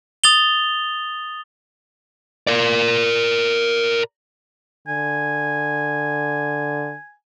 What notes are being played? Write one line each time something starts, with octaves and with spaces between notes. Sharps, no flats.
D#6 A6 F7 G7
A#4 D5
D3 G#5